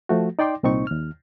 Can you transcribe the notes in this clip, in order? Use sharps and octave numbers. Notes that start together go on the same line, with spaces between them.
F3 A3 F#4
D#4 D5 G5 C6 D6
C2 A#2 C4 D#4 C#6
D#2 F6